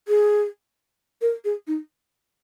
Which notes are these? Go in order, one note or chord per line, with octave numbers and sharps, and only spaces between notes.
G#4
A#4
G#4
D#4